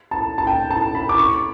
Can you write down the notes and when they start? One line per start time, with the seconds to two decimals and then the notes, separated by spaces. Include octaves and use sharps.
0.11 A5
0.38 A5
0.47 G5
0.71 A5
0.95 B5
1.09 D6
1.18 C#6